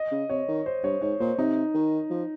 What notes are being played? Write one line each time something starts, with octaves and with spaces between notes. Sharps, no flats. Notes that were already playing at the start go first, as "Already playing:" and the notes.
Already playing: D#5
C#3
C3 C#5
D#3
C5
G2 C#5
G#2 C#5
A#2 C5
C3 D#4
D#3
F3